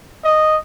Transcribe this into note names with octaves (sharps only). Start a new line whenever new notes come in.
D#5